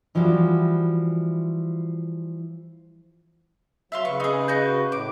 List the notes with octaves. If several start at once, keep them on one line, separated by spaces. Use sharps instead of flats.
E3 F3 G3 E4 F#4
F#3 E5 F5 C6
C#3 B4 C#6
D#4 G#4
F#4 D#5 G6
A2 D6